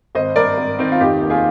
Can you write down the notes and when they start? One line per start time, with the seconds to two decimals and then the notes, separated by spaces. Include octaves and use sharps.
0.15 G#1 C5 D#5
0.36 G2 A#4 D5
0.57 G#1
0.79 D#3 C4 D#4
0.92 F4
1.01 F1 D#4 G4
1.22 D#2
1.30 F4 G#4